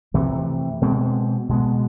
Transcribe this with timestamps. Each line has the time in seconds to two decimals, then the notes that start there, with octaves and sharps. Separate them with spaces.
0.14 F2 C3 E3 A3
0.82 B2 G#3 C4
1.49 B2 G#3 B3